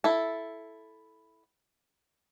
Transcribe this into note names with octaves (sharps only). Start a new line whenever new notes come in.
E4 A4